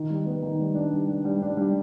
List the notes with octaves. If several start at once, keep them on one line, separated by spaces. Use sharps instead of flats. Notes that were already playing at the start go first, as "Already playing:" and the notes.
Already playing: D#3
G3
B3
D#3
G3
D4
G3
D4
G3
D4
G3